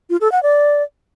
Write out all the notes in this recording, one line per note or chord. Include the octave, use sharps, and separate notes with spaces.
F4
A4
F#5
D5